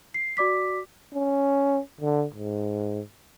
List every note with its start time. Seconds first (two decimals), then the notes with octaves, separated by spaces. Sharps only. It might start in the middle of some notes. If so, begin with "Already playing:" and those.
0.14 C7
0.37 F#4 D5 D6 B6
1.14 C#4
2.01 D3
2.34 G#2